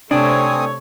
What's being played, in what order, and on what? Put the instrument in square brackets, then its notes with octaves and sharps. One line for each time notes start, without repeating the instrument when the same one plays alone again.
[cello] C3 [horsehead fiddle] A3 C#5 [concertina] C4 G#5 D#6 [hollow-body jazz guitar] D4